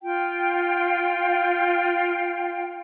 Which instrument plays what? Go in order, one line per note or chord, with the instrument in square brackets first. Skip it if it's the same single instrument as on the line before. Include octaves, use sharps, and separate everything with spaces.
[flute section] F4 G5